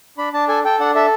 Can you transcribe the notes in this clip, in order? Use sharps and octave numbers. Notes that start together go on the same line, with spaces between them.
D4 B5
D4 A5
A4 G#5
A4 G5
D4 F#5
A4 E5